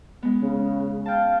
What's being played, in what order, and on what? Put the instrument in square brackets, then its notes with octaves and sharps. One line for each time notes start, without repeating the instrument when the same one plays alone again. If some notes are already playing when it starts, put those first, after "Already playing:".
[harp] G#3 B3
[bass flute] C#3
[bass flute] F5 [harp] G5 A5